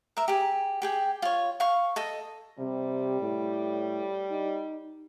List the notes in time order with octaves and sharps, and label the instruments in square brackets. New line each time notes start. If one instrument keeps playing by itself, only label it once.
[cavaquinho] A#4 E5
G4 G#4
G4 G#4 G5
F4 C#5
F5 C#6
A4 D#5
[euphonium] C3 [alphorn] G3
[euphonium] A2
D#4